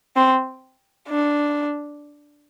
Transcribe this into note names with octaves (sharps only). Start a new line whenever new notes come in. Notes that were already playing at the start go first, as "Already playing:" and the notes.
C4
D4